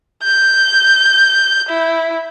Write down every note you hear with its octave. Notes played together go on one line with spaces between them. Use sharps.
G6
E4